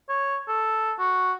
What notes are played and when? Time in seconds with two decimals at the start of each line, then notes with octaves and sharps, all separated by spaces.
0.09 C#5
0.48 A4
0.99 F#4